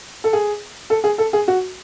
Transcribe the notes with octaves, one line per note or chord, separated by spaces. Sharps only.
A4
G#4
A4
G#4
A4
G#4
F#4